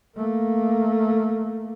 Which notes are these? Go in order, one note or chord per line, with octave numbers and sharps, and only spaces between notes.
A3 A#3